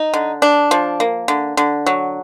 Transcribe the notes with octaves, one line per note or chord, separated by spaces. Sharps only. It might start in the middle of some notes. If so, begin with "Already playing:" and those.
Already playing: D#4
D3
D4
F3
A#3
D3
D3
F#3